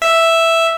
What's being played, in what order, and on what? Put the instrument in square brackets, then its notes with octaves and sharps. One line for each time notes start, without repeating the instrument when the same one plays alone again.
[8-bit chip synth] E5